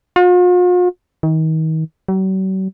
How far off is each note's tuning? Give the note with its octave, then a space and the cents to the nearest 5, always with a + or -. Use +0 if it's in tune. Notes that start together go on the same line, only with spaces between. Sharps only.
F4 +45
D#3 +35
F#3 +45